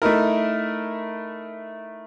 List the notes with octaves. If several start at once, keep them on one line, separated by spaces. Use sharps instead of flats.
A3 D#4 E4 A#4